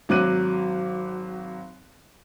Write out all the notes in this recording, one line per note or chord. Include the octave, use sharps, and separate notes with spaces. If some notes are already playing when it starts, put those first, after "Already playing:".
G#1 F#3 D6 F#6 D#7